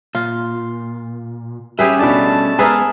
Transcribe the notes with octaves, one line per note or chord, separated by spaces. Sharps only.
A#2 F4
G3 C#4 G4 G#4 B4 E5
B2 A3 D4 A5
G#3 B3 G#4 A#4 B4 E5